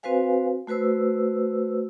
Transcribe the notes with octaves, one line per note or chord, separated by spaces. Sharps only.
C4 F#4 B4 C5 F5 G#5
A3 F#4 B4 C5 E6